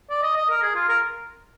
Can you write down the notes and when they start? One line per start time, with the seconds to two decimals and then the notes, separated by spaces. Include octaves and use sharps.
0.10 D5
0.23 D#5
0.36 D#5
0.50 A#4
0.62 G#4
0.76 F4
0.89 A#4